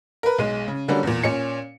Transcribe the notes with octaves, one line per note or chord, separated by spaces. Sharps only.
A#4 B4
B1 G#3 D#7
C#3
D3 F#3 G3 A#3 C#4 D4
E2 A#2
A#2 C#4 C#7